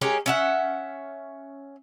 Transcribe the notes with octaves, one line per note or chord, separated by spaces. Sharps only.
G#3 C#4 G4 A#4
C#4 E5 F#5